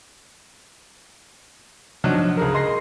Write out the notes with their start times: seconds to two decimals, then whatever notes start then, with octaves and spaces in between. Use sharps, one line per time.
2.04 F3 F#3 D4 D#4
2.37 C#2 G#4 A#4
2.54 D#5 C6 A#6 C7